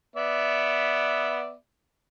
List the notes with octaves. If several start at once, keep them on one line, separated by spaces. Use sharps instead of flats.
B3 D5 E5